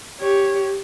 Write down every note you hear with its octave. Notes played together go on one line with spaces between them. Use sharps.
G4 C#5